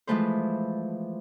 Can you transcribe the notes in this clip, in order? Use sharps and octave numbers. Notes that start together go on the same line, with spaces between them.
E3 F3 G#3 A3 B4 C5